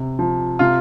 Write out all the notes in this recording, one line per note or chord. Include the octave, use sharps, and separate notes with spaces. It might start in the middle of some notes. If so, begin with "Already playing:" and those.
Already playing: C3
F3
C3 F4